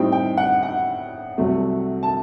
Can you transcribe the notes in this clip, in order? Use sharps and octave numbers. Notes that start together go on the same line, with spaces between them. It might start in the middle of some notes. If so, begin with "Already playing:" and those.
Already playing: A2 G3 C4 D#4 G5
G5
F#5
F#5
C2 C3 F#3 A3
A5